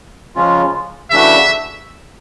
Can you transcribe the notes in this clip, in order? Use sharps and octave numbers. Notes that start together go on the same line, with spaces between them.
C#3 F3 G#3 C#4 F4
C#3 E3 A3 D4 F#4 E5